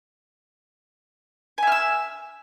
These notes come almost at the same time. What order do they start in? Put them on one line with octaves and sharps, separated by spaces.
G#5 E5 F6 E6